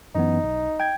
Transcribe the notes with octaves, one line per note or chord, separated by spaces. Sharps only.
F#2 E3 B3 D#4
B1
G5 G#6